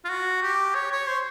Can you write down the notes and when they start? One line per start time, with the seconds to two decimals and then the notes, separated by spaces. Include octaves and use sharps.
0.04 F4
0.09 F#4
0.42 G4
0.75 C#5
0.92 C#5
1.08 C5